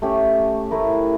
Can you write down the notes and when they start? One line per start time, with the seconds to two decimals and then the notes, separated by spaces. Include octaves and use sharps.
0.02 A3 C#4 G4
0.71 A3 E4 A#4